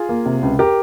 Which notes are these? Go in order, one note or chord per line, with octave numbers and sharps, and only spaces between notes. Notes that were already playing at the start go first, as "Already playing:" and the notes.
Already playing: F4 G#4
A#3
C3
C#2
G4 A#4